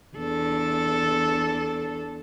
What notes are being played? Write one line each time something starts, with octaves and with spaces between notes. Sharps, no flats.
E2 D4 A4